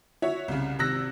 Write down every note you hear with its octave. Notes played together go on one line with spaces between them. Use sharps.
F#4 C#5 E5
C2 C#3
G#1 C3 E6 F#6 A#6